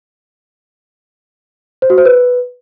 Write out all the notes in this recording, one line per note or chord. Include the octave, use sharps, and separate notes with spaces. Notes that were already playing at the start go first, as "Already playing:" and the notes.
C5
F#4
C5
B4